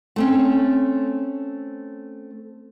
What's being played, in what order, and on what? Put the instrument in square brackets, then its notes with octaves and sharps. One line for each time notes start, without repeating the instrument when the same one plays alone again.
[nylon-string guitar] A3 C4 C#4